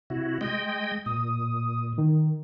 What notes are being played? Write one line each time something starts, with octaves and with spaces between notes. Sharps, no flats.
C3 E4 F#4
G#3 D#5 G5
A#2 D#6
D#3